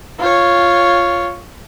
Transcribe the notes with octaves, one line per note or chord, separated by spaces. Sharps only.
F4 C#5